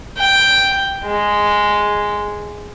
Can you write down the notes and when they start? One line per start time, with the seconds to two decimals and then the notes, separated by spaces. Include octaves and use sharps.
0.17 G5
1.05 G#3